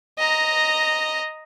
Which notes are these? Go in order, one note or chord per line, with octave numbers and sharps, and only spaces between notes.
D#5 A#5